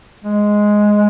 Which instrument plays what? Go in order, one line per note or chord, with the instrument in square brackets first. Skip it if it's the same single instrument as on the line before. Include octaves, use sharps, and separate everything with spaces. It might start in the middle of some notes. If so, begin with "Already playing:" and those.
[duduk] G#3